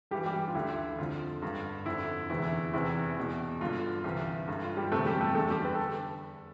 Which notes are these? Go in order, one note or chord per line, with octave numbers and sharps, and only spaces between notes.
G2 E3 G3 G4
G3 G4
F4
D2 D3 E4
F2 D3 F4
G2 D3
F2 D3 E4
E2 C3 E3 E4
E2 C3 E3 E4
E2 B2
G2 D3 F4
C2 C3 E3
G2 D3
F4
G3 G4
F2 C3 E3 A3 A4
G3 G4
A3 A4
E2 D3 A3 A4
G3 G4
B4
A4